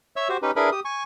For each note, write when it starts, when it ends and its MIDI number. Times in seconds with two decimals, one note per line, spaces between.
0.16 0.28 73
0.16 0.28 76
0.16 0.28 88
0.29 0.37 66
0.29 0.37 67
0.29 0.37 72
0.42 0.51 61
0.42 0.51 63
0.42 0.51 67
0.42 0.51 71
0.56 0.70 62
0.56 0.70 64
0.56 0.70 68
0.56 0.70 70
0.56 0.70 71
0.56 0.70 83
0.72 0.80 67
0.72 0.80 87
0.85 1.03 80
0.85 1.03 85